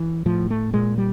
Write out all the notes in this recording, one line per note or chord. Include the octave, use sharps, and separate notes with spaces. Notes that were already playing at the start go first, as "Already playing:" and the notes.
Already playing: E3
A2 F3
A3
A#2 G#3
G3